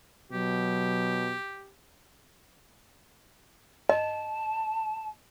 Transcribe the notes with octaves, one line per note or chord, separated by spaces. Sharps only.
B2 F#3 G4
D#5 A5